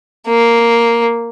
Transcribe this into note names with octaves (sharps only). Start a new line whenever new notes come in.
A#3